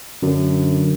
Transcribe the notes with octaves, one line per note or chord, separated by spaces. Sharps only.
F#2 D3